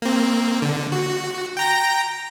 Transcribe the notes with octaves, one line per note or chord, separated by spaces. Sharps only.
A#3 C4
D3
F#4
G5 A#5 A#6